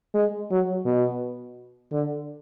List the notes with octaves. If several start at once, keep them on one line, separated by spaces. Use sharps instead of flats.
G#3
F#3
B2
D3